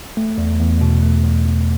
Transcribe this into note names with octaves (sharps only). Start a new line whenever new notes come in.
A3
E2
E2
B2
A3
E2
E2